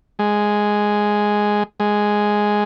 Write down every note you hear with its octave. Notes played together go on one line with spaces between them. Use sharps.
G#3
G#3